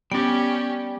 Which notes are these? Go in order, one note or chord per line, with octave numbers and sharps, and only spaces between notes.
G3 B3 C#4 G4 D5